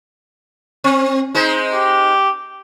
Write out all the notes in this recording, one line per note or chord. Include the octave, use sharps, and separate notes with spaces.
C4
G#3 D#4 C5
G4